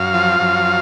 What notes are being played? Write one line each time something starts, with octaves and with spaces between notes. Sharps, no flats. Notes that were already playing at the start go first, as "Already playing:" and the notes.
Already playing: F#2 F5
F3
F#2